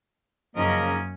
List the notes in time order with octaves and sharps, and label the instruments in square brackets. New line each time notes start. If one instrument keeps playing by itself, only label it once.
[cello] F#2 C#4 [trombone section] C#3 F3 D#4 [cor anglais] A#3 [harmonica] A#4 D#5